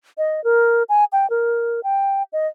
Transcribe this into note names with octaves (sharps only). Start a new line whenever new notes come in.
D#5
A#4
G#5
G5
A#4
G5
D#5